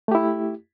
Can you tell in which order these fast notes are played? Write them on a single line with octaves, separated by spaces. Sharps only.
A3 G4 E4